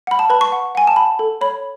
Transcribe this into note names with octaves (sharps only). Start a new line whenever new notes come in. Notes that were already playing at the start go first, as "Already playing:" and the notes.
F#5 B5
A5
B4 B5
C#6
F#5
F#5 G#5
A5
F#5 B5
A4
C#5 B5